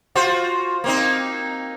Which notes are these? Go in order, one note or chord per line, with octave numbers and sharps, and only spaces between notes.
F4 F#4 C5
A#3 C4 D#4